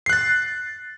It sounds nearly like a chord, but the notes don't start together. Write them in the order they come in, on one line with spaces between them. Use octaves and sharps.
C7 F#6 A6